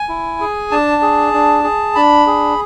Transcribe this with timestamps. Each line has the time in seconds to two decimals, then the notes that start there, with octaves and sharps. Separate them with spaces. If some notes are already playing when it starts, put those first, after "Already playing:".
Already playing: G#5
0.09 E4
0.40 G#4
0.71 D4 A5
1.02 G#4
1.34 D4
1.64 G#4
1.95 D4 B5
2.27 G#4